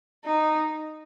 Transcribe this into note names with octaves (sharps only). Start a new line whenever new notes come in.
D#4